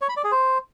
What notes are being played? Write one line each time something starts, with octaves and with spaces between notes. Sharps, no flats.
C#5
B5
D5
G#4
C5